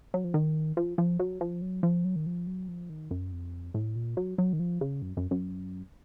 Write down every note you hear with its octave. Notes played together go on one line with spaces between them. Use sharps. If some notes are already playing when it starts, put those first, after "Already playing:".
F#3
F3
D#3
F3
F3
F#3
F3
F#3
F3
F#3
D#3
F3
F#3
F3
D#3
F#2
F2
A2
A#2
F#3
F#3
D#3
F3
C#3
F#2
F#2
F#2